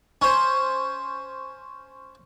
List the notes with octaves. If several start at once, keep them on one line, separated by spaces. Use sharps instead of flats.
C#4 C5